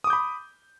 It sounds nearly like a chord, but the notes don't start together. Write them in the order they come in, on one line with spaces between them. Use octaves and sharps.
D#6 D6 G6 B5